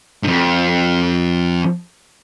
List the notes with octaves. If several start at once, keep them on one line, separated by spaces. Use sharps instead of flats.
F2 G#2